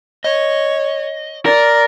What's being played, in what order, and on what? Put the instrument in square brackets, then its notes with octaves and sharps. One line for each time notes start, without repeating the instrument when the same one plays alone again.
[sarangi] C#5 [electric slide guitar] D#5
[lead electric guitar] A#4 [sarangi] D5